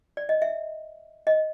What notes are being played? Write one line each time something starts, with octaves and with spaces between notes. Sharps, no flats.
D5
D#5
E5
D#5